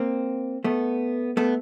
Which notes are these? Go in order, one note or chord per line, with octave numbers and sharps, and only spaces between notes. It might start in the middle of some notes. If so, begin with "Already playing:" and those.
Already playing: A#3 C4
A3 B3
A3 B3